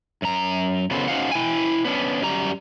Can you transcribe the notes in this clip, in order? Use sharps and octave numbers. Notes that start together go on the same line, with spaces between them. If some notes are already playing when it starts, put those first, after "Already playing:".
F#2 A#5
C#3 F#3 B3 A4 C5
C#4 D#4 F#4 C5 F5 F#5
E4 G5 G#5
B3 C#4 D4
F#2 G3 A#5